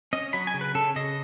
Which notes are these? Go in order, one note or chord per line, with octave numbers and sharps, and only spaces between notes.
C#4 D#5
F#3 B5
G#5
C#3
B4
C#3 A4
C#3 D#5